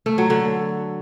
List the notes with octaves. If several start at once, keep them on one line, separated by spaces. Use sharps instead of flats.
A3
F#3
D3